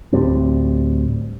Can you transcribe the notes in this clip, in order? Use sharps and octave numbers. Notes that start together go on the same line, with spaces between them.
D2 A2 G3 C4